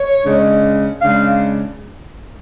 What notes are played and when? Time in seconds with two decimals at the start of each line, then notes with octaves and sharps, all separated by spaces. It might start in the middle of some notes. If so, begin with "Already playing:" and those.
Already playing: C#5
0.25 C#3 G#3 D4
1.01 C#3 G#3 D4 F5